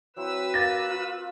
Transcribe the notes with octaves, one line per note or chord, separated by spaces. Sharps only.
F#3 C4 E4 B4 E6
A#3 A6 A#6
F4